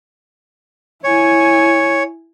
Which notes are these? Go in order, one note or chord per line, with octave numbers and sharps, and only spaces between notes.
E4 C#5 G#5